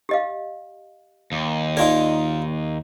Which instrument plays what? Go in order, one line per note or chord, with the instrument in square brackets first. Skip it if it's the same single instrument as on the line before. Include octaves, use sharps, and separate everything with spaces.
[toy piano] G4 D#5 F5
[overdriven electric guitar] D#2
[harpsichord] D#4 F4 A#4 [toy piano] D5 G#5